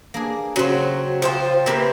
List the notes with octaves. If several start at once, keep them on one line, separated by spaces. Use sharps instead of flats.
A#3 D4 G#4
C#3 F#3 C4 C6
F3 C5 G5
A#3 C4 E4 G4 B4